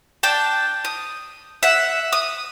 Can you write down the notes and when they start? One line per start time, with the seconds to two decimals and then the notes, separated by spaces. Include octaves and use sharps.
0.23 D4 G5 A5
0.85 D#6
1.63 E5 F#5
2.12 D#6